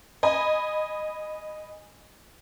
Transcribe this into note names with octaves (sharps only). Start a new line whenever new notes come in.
D#5 G#5 B5